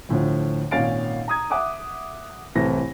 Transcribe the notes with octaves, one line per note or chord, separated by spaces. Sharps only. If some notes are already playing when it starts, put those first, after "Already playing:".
D2 A2 D3 F3
G#1 A#2 C#4 F5 A6 D7
A#5 D#6 G#6
E5 F#5 D6 D#6
C2 A2 E3 A3 C4 A#6